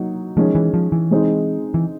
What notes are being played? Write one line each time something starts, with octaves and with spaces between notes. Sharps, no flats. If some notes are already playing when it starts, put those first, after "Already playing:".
Already playing: F#3 A#3 D#4 F#4
D#3 F3 G#3 C#4
E3
F3
E3
G#3 C4 D#4
E3